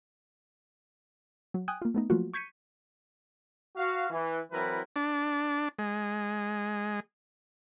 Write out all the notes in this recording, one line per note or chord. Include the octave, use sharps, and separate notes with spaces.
F#3
G5 G#5 D#6 F#6
A#3 F4
A3 B3 D#4
F3 F#3 A3 A#3 F4 F#4
C#6 G6 G#6 B6 C#7 D#7
F#4 F5
E3
E3 F#3 C4 E4 A#4 B4
D4
G#3